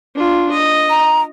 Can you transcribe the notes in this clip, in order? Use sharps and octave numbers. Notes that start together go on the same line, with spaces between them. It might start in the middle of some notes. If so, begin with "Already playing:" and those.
D4 F4
D#5
A#5